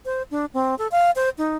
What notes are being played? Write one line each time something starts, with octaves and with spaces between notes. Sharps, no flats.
C5
D4
C4
A4
F5
C5
D#4